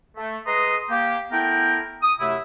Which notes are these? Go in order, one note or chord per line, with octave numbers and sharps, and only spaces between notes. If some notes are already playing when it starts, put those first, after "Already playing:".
A3
G#3 B4 D#5 A#5 C6 D#6
A#3 G4
A3 B3 E4 A#4 G5
D#6
F#2 C3 A3 E4